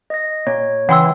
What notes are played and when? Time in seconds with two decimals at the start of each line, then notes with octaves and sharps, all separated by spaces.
0.10 D#5 A#6
0.47 A#2 C#5
0.89 C#3 E3 F#5 G5 C6 E6